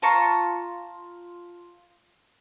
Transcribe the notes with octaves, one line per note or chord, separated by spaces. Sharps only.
F4 A5 A#5 C#6